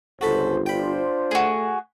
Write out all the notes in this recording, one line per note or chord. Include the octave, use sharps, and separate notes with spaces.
G1 C#2 F#4 A4 C5 B5
D4 F4 C5 G5 B5
A3 F#4 G#4